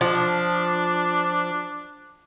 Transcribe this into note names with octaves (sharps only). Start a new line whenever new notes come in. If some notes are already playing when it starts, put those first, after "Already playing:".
F3 D4